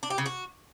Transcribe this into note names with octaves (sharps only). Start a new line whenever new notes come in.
D4
G4
C#3
F#4